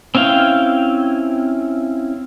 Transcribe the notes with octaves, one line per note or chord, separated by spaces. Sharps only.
C4 C#4 E4 F5 G5